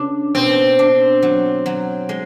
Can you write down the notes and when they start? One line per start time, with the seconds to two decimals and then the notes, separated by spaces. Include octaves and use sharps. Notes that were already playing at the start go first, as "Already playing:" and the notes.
Already playing: C#3 D4
0.35 B2 C4
0.79 D4
1.22 F#3
1.66 F#3
2.09 G#3